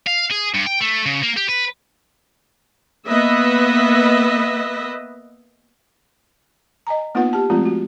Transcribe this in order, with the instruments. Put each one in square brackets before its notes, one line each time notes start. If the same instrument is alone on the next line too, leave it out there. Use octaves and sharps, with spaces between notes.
[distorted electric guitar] F5
G#4
G2
G5
A3
C#3
A#3
G4
B4
[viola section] A#3 B3 B4 D#5 E5
[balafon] D#5 G#5 A#5
A#3 B3 D#4 F4 B4 F#5
G4 A5
F3 G#3 A3 C4 F4
F#4